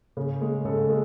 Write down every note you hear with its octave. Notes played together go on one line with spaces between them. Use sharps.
C#3
G#3
C#3 A4
G#3